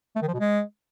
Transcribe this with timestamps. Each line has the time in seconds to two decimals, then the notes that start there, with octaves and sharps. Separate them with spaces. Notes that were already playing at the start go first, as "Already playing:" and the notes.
0.16 A3
0.22 D#3
0.28 F3
0.34 B2
0.40 G#3